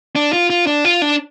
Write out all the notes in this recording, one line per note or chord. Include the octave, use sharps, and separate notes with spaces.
D4
F4
F4
D4
F4
D4